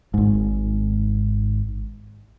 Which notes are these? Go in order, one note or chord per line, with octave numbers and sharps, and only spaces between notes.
G#1 G#2